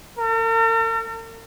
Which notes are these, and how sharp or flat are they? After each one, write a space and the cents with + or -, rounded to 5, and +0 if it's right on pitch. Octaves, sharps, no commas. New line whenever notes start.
A#4 -45